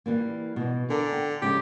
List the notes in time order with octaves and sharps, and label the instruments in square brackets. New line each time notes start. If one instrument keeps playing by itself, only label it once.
[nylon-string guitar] E3 G3 A#3
B2 E3
[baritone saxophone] D3 [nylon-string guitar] A#4 G#5
[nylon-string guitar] G5
[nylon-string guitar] G#2 C#3 F3 [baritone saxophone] G4